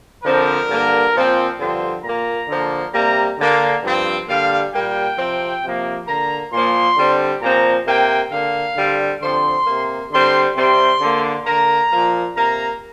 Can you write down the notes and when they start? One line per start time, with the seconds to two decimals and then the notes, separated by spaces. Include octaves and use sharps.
0.23 D3 F3 C4 A#4
0.68 G2 D3 A#3
1.14 A#2 F3 C4
1.59 G2 D3 F3 C4 C6
2.04 A#2 A#3 A#5
2.48 D3 F3 A#3
2.93 C3 G3 A#3 A#5
3.38 D3 A#3
3.83 G2 F3 C4
4.27 D3 G3 A#3 F5
4.73 A#2 G3 A#3 G5
5.18 C3 F3 C4
5.63 C3 F3 A#3
6.07 D3 A#3 A#5
6.52 A#2 F3 A#3 C6
6.97 D3 G3 C4
7.42 A#2 F3 C4 A#5
7.86 C3 A#3 G5
8.32 D3 A#3 F5
8.76 D3 G3 C4
9.21 D3 F3 C4 C6
9.67 C3 A#3
10.11 D3 G3 C4 C6
10.56 C3 G3 C4 C6
11.01 D3 A#3
11.46 D3 A#3 A#5
11.91 A#2 F3 A#3
12.35 C3 A#3 A#5